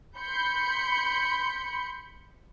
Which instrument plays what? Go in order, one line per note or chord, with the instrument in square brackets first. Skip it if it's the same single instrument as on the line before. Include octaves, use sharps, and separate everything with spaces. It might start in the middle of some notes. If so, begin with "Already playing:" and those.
[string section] B5 C6 G6 C#7